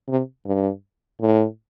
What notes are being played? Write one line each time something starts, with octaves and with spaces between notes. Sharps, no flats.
C3
G2
A2